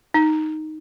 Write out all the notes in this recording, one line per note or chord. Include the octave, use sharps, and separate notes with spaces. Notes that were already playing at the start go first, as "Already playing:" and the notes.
D#4